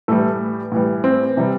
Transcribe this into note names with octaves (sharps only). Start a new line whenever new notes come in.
A2 E3 G3 A3 A4
A2 E3 G3
C4
C3 E3 G3